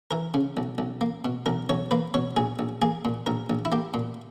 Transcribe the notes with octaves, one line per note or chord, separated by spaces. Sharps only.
E3 A#4
C#3
B1
B1
A#3
B2
B1 A#4
B1 C#5
A#3 B4
B2 C#5
A#1 G#4
A#1
A#3 G#4
A#2
A#1 A#4
A#1
E4
A#3 G4
A#2